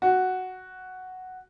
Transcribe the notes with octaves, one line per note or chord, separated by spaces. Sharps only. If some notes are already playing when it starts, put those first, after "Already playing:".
F#4